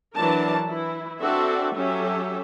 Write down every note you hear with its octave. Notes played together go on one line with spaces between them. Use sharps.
E3 F#3 D4 A#4 A5
E3 E4
C4 D4 F#4 A4 E5
F#3 C#4 G4 A4 E5